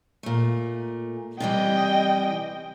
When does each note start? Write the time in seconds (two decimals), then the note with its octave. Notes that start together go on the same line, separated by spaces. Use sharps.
0.23 A#2 A3
1.40 C3 E3 G3 D#5 G5